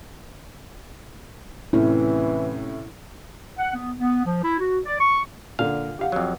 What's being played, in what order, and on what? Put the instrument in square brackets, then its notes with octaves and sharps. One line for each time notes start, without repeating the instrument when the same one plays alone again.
[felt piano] A2 C3 C#4 [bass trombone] E3 [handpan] E4
[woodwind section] F#5
B3
B3
F3
E4
F#4
D5
C#6
[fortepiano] A#2 D3 [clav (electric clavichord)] F5
[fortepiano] G4 F5 F#5
[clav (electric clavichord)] F2 F#3